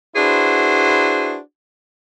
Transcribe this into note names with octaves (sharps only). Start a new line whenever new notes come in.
D4 E4 F#4 G#4 B4 C5